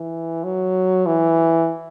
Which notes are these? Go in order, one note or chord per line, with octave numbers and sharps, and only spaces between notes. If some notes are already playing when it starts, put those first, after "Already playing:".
Already playing: E3
F#3
E3